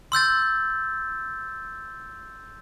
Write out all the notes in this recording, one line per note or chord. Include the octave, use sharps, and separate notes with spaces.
C6 E6 G6 A6